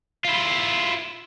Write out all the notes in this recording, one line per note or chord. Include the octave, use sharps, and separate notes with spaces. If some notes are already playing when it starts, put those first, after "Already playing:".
E4 F4